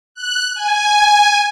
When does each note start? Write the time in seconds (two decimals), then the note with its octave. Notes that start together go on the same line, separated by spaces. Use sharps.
0.15 F#6
0.54 G#5